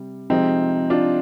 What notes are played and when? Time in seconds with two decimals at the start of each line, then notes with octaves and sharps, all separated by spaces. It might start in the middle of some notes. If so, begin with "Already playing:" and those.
Already playing: C3 G3
0.30 C3 F3 G#3 C4 D#4
0.90 D4 F4